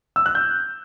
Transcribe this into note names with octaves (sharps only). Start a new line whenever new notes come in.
E6
F#6
G6